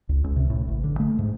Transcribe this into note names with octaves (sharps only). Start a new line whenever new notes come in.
C#2
C#2
C3
A2
A1
D3
A3
G#2